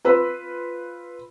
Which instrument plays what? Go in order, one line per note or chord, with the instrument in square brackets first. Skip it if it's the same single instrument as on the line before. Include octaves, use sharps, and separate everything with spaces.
[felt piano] F4 B4 C5 E6